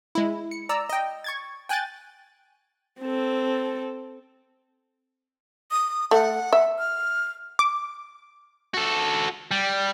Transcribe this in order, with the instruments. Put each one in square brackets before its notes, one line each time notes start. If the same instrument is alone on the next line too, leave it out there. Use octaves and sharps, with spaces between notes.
[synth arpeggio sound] G#3 E4
C#7
D5 A#5 E6
D#5 G5
C#6 G#6 A6
G5 G#5 F#6 G6 A6
[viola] C4 A4
[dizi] D#6
[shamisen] A3 [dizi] F#5
[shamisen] E5
[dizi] F6
[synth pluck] D6
[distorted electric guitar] F#4 A4
G3